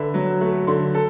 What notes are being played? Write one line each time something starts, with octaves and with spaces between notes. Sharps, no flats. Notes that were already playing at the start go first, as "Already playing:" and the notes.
Already playing: D3 B4 E5
F#3
A3
D3
A4